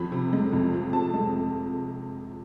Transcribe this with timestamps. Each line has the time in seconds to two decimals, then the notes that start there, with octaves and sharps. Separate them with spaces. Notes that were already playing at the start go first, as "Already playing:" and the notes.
Already playing: F2 F3 B5
0.12 C3
0.33 G#3
0.53 F2
0.74 F3
0.93 C3 A5
1.14 G#3